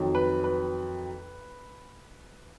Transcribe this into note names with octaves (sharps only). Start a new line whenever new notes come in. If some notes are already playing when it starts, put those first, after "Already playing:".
Already playing: F2 D#3 F#3
B4
B4